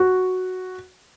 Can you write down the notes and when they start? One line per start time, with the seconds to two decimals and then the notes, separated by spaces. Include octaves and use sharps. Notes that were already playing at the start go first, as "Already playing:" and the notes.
Already playing: F#4